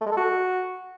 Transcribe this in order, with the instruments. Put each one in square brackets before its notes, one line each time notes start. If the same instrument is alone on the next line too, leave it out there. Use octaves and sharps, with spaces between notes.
[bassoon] A3
G#3
A4
F#4